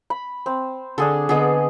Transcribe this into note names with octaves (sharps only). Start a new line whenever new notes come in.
B5
C4
D3 D4 G#4 A4
D3 B3 G#4 D#5